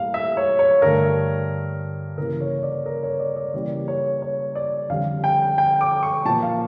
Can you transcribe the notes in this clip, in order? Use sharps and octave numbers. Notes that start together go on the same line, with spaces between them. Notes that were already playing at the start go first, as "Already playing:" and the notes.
Already playing: A2 G3 A#3 F5
E5
C#5
C#5
G2 D3 A3 A#4
C#3 E3 A#3 A#4
C#5
D5
A#4
C#5
D5
D5
C#3 E3 G3 A#3 D5
C#5
C#5
D5
F2 D3 G3 F5
G5
G5
D6
C#6
A#2 F3 A#3 A5
F5